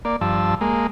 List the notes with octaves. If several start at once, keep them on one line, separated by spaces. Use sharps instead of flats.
A#3 D5
G2 F3 A5 E6
G#3 A#3